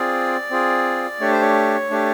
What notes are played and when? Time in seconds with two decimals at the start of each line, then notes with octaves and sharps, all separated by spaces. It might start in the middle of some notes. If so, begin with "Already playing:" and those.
Already playing: C4 F4 G#4 D5
0.50 C4 F4 G#4
1.20 A3 D4 G4 C#5
1.31 C5
1.41 C#5
1.91 A3 D4 G4